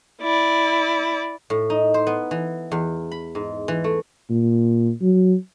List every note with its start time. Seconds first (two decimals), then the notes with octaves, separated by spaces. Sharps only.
0.22 E4 D5
1.50 A2
1.70 D#4
1.94 C5
2.07 B3
2.31 E3
2.72 E2
3.11 B5
3.35 G#2
3.68 E3
3.84 A3
4.30 A#2
5.01 F#3